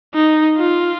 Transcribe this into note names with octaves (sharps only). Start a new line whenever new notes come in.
D#4
F4